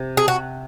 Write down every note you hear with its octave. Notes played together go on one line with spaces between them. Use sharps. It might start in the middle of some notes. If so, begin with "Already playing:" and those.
Already playing: C3
G#4
F#4